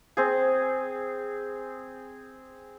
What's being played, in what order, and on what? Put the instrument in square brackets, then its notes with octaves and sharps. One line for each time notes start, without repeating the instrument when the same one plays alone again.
[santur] C4 G#4